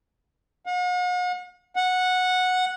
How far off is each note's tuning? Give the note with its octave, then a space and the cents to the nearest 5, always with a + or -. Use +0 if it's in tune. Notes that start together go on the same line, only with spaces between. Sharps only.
F#5 -45
F#5 -10